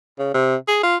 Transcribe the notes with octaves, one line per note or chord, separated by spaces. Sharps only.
C#3
C3
G#4
F4